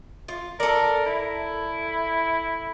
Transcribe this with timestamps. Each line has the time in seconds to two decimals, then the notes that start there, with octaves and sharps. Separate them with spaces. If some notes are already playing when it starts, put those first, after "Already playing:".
0.28 F4
0.60 A4 A#4 D5
1.06 E4